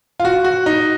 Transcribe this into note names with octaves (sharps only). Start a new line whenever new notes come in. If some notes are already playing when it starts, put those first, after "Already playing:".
F4
F#4
F#4
D#4